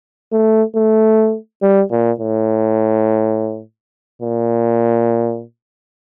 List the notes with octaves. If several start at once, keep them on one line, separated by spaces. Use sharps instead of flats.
A3
A3
G3
A#2
A2
A#2